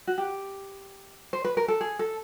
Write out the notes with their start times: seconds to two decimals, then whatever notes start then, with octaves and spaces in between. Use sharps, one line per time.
0.07 F#4
0.18 G4
1.33 C5
1.45 B4
1.57 A#4
1.68 A4
1.81 G#4
1.99 A4